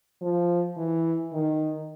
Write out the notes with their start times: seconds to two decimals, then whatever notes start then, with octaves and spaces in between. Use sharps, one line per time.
0.21 F3
0.77 E3
1.33 D#3